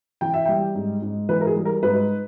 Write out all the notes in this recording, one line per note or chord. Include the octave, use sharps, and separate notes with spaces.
E3 G5
E5
G3 G5
G#2
G#2
E3 B4
A#4
G#4
G3
A#4
G#2 B4